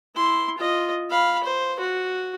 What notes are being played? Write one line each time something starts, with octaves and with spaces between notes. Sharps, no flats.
E4 C6
F4 D#5
F5 B5
C5
F#4